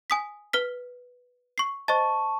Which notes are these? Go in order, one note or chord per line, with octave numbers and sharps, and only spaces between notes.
G#5 D#6 B6
B4 F6 B6
C#6 C7
C5 D#5 A5 C#6 A6